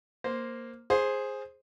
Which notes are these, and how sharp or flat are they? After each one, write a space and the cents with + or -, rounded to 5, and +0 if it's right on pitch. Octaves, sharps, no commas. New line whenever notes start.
A#3 +0 C5 +0
G#4 +0 C5 +10